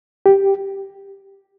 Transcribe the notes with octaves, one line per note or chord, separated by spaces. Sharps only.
G4